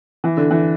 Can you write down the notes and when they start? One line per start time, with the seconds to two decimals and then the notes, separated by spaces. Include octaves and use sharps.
0.24 E3
0.37 D3
0.51 E3